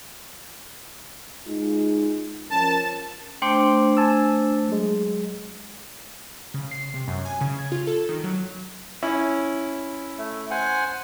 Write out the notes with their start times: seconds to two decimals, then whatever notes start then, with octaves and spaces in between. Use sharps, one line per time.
1.46 G#3 D#4 F4
2.50 F3 C#4 A#4 A5
3.42 A3 D4 C5 G5 C6 D6
3.97 G#5 A5 E6
4.69 F#3 G#3
6.54 C#3
6.71 C7
6.94 C3
7.08 F#2
7.25 G#5
7.41 C#3
7.59 G#6
7.72 F4
7.87 A4
8.09 D#3
8.24 F#3
9.03 C#4 E4
10.18 A3
10.51 C5 F#5 G#5